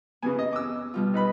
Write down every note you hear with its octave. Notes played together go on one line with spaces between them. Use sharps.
C#3 E3 B3 G#5
D#5
D6 E6
B2 G3 F4
D#4 B4 B5